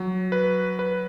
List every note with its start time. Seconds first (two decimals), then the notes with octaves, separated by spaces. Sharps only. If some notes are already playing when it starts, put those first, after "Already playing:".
Already playing: F#3
0.32 B4
0.79 B4